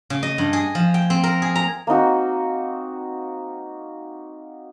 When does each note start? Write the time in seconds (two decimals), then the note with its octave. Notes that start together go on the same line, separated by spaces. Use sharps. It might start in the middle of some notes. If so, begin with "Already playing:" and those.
0.10 C#3
0.23 D#5
0.38 G2
0.53 G#4
0.75 F3
0.94 G5
1.10 C4
1.23 A#4
1.42 G#4
1.55 A#5
1.87 A#3 C4 D#4 F#4